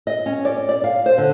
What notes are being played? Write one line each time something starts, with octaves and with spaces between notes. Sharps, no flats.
D#5
C#4
D5
D5
F5
C5
D3